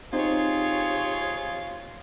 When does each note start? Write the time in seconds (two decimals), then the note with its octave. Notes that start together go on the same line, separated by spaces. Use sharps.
0.13 C4 D#4 F4 G4 G#4 C5 C#5